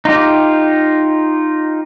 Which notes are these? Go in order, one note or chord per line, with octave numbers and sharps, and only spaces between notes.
D#4 F4 G4